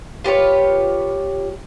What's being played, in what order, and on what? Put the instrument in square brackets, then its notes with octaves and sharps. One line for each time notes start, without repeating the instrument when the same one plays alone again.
[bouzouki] F4 G4 B4 C#5